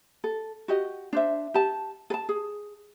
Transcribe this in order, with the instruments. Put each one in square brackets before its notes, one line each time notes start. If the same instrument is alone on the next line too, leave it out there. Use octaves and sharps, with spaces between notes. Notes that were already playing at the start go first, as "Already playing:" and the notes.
[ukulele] A4
F#4 G4 D#5
D4 C5 E5
G4 A5
A4 A5
G#4